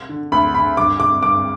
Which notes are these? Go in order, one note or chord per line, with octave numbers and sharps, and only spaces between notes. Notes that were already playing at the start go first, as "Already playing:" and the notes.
D3
D2 B5
D3 B5
G2 D6
D3 D6
G2 D6